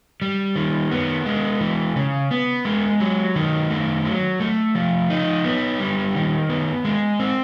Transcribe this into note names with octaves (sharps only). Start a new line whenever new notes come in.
G3
D#3
B3
G#3
E3
C#3
B3
G#3
F#3
D#3
A3
F#3
A3
F3
D#4
B3
G3
D#3
B3
G#3
C4